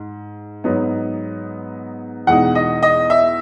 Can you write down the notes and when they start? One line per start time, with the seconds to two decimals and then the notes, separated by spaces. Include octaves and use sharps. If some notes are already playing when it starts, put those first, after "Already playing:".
Already playing: G#2
0.64 G#2 F#3 B3 D#4
2.27 E2 B2 G#3 D#4 F#5
2.55 D#5
2.82 D#5
3.10 E5